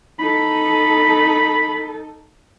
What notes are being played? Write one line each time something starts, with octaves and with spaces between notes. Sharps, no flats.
D#4 A4 B5